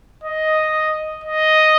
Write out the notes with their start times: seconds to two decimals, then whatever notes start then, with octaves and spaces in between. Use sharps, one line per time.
0.24 D#5
1.24 D#5